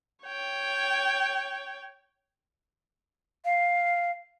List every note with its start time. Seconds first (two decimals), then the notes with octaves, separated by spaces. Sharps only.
0.24 C#5 G5
3.45 F5